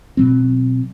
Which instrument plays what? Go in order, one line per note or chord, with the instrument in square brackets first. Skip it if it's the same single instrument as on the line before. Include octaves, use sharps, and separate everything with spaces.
[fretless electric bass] B2 F#3 C4